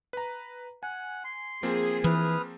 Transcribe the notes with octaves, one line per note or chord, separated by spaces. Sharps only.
B4 A#5
F#5 G#5
C6
F3 A#3 C4 G#4
E3 B4 D#6 F6